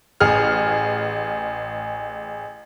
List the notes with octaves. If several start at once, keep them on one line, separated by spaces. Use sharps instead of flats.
A1 G#4 F6